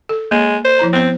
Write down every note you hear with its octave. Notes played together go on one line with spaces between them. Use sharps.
A4
G#3 A#3
C5
F3 E4 A#5
B3 C4 C5